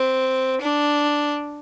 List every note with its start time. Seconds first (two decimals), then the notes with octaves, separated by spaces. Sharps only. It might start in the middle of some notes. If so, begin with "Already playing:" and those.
Already playing: C4
0.61 D4